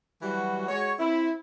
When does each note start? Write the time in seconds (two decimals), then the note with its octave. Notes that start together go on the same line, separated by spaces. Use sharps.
0.22 E3 F#3 G3 F#4
0.68 G#3 F#4 C#5
0.99 C4 E4